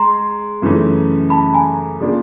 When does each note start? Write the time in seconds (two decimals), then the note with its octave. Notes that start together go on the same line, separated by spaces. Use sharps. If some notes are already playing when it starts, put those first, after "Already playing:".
Already playing: G#3 A#5 C6
0.62 F#2 C#3 E3 A3 C#4
1.30 A5 B5
1.54 G#5 A#5
2.00 C#3 F3 A#3 D4 F4